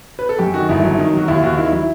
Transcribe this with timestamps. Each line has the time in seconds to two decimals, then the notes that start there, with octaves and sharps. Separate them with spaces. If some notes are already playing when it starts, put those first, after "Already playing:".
0.19 B4
0.29 A4
0.39 F#2 G4
0.54 D#3 F#4
0.69 G1 E4
0.84 F#3 E4
0.98 D#3 D#4
1.14 F#3 F#4
1.28 D#2 E4
1.43 D#2 F#4
1.58 D#3 E4
1.72 F#3 E4